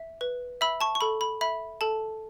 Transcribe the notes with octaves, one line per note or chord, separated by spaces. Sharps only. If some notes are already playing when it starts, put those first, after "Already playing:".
Already playing: E5
B4
E5 B5 E6
A5 C#6
C#6
A4 B5
B5
E5 B5
A4 A5